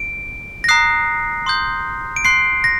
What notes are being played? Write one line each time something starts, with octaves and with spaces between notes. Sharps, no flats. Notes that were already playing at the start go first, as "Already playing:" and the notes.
Already playing: D7
A#6
A#5 D#6 F#6 C7
C6 D#6 G6
D7
C6 F#6 C7
A#6